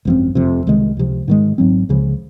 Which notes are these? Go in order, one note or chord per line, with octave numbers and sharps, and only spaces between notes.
G#1 F#2 F3 C4
F1 F2 C3
C2 C3 D#3 G#3
C#2 C3 F3
G#2 D#3 G#3
G#1 G#2 F#3 C4
C#2 C#3 F3